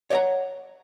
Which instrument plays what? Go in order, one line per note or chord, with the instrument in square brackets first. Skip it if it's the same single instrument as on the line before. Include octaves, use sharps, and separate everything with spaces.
[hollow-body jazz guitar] C#5 D5 E5 F#5 A#5